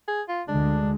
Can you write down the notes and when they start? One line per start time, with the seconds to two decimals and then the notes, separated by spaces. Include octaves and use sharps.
0.08 G#4
0.29 F4
0.48 D2 D3 G#3 D4